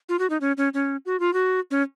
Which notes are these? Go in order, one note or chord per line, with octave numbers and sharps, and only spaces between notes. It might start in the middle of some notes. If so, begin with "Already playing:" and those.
F4
F#4
D#4
C#4
C#4
C#4
F#4
F4
F#4
C#4